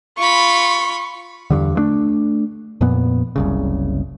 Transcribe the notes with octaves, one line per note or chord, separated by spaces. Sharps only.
F4 B5 C#6
E2 G2 D3
G2 A3 D4
F2 A#2 B3
F#1 C2 C#3